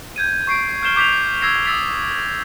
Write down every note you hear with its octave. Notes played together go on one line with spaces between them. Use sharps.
G6 G#6 D#7
C#6 C7 D7
F6 G6 C7 E7 G7
D6 G6 B6 C7 F7
E6 G#6 A#6 C7 E7
D#6 E6 A6 B6 F7